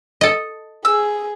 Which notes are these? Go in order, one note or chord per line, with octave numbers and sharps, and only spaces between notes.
A4 D#5
G#4 E6